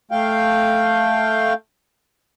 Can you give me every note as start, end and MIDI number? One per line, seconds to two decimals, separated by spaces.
0.11 1.53 57
0.11 1.53 77
0.11 1.53 79